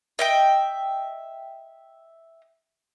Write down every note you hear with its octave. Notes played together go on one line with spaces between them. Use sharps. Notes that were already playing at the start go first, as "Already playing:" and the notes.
D#5 E5 G5